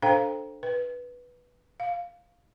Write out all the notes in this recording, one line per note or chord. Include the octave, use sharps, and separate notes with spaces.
D4 A4 C5 F5 G5 A#5
B4
F5